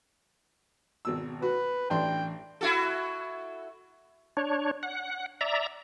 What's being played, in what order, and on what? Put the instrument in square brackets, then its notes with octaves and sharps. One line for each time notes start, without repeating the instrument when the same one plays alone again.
[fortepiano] G#1 B2 E6
[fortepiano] F#4 [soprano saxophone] B4
[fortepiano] A1 D4 C6 [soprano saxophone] G5
[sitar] E4 F#4 A4
[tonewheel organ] D4 C#5
F#5
D5 E5 A#5